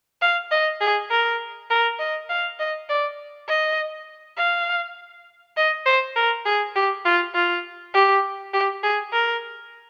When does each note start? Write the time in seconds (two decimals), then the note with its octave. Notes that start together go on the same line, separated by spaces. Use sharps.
0.22 F5
0.51 D#5
0.81 G#4
1.10 A#4
1.70 A#4
1.99 D#5
2.30 F5
2.59 D#5
2.89 D5
3.48 D#5
4.37 F5
5.57 D#5
5.86 C5
6.16 A#4
6.45 G#4
6.75 G4
7.05 F4
7.34 F4
7.94 G4
8.53 G4
8.83 G#4
9.12 A#4